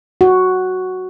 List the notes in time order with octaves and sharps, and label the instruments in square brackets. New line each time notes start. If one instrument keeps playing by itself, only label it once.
[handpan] F#4